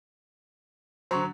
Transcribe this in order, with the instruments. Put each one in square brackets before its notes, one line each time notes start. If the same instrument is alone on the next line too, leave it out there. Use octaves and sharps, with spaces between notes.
[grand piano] D3 F#3 [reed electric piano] C5 A#5 C#6